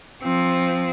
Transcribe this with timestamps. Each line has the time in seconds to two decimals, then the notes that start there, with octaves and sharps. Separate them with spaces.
0.22 F3 C4